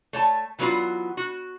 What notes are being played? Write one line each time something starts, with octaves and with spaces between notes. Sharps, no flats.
A3 C#5 A5
E3 F#3 B3 C#4 F4 F#4
F#4